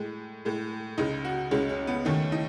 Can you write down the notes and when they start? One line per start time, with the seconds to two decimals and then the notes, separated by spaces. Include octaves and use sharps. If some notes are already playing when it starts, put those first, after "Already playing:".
Already playing: A2 G#3
0.45 A2 G#3
0.98 C#2 C#3 G#3 D#4
1.25 F#4
1.51 C#2 C#3 G#3 C#4
1.69 C#4
1.87 B3
2.05 D#2 D#3 A3 C#4
2.32 D#4